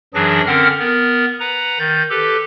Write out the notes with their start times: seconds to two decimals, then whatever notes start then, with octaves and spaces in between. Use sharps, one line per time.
0.14 F#2 E3 F#3 D4 G#4 A#6
0.46 D3 C4 C#4 A#4 F#5 F6
0.79 B3 A#4
1.40 B4 F#5 A#5
1.79 D#3 G6 A6
2.10 G4 A4 B4